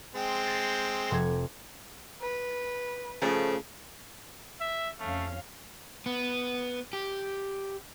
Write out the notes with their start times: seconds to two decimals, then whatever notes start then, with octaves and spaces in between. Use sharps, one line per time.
0.15 G#3 C4 G5
0.47 A6
1.11 F1 G#6
2.21 B4
3.22 C#3 F3 A3 C#5
4.61 E5
5.00 F2 A3 C#4 F5
6.06 B3
6.93 G4